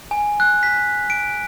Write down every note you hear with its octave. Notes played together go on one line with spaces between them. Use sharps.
G#5
F#6
B6
D7